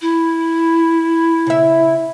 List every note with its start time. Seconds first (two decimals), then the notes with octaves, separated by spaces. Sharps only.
0.01 E4
1.46 C#3 E5